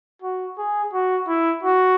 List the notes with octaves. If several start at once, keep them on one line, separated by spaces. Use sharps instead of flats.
F#4
G#4
F#4
E4
F#4